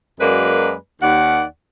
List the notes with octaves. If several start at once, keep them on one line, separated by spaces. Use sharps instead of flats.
F#2 F#3 G#3 A#3 B4 D5
D#2 D5 F#5